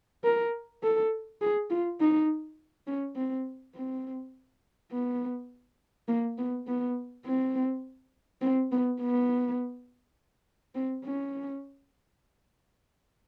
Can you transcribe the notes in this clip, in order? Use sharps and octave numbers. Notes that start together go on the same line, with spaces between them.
A#4
A4
G#4
F4
D#4
C#4
C4
C4
B3
A#3
B3
B3
C4
C4
B3
B3
C4
C#4